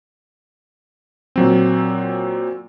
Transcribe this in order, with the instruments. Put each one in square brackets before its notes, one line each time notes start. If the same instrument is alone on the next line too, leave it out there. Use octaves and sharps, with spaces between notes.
[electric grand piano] A#2 F#3 C4